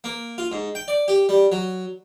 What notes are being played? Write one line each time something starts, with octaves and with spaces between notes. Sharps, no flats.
A#3
F4
G#2
G5
D5
G4
G3
F#3